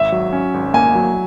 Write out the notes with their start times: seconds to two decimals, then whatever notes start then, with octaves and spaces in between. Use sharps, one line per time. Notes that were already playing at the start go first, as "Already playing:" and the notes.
Already playing: G#1 E5
0.12 F#3
0.33 C#4
0.54 G#1
0.74 A#3 G#5
0.95 F#3